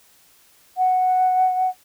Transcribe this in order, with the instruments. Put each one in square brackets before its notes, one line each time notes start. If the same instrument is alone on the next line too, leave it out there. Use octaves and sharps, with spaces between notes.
[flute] F#5